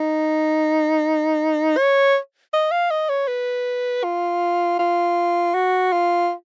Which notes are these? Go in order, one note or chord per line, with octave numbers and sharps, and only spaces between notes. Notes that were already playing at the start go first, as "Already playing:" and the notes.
Already playing: D#4
C#5
D#5
F5
D#5
C#5
B4
F4
F4
F#4
F4